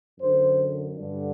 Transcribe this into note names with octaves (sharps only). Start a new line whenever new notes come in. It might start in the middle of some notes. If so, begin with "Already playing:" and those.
F#2 D3 C5
G2 D3